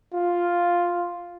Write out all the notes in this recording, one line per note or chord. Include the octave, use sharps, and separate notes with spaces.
F4